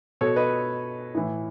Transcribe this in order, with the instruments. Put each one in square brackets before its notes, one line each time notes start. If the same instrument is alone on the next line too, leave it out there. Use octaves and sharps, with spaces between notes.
[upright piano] B2 A4 C#5
B4 D#5
A2 E3